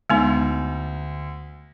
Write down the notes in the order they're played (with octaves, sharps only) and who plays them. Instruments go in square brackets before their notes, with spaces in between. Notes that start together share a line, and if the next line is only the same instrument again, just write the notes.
[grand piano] D2 [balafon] G#3 B3 D#4